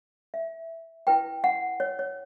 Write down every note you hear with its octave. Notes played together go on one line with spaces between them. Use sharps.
E5
E4 B4 G5
F#5
C#5
C#5